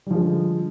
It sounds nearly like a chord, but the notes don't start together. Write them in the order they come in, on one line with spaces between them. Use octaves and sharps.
G3 F3 G#3 D3